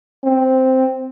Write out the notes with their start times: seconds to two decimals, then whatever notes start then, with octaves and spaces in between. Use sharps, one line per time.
0.24 C4